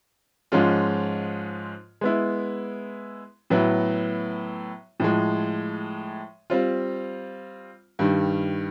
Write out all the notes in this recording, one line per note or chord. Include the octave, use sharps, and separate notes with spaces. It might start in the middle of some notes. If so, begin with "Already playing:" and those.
G#2 F3 G#3 C#4 F4
G#3 B3 E4
A2 F#3 B3 E4
A2 F3 G#3
G3 C4 F4
G2 D#3 G3